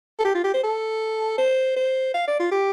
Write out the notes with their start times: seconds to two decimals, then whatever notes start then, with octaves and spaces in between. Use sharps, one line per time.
0.19 A4
0.25 G4
0.35 F4
0.44 G4
0.54 C5
0.64 A4
1.38 C5
1.77 C5
2.14 F5
2.28 D5
2.40 F4
2.52 G4